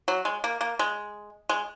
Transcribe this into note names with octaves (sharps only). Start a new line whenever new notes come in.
F#3
G#3
A#3
A#3
G#3
G#3